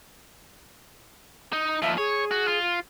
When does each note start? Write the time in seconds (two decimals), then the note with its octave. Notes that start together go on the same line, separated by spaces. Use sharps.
1.53 D#4
1.82 D#2 F3 E5
1.98 G#4 C#5
2.31 F#4
2.48 F4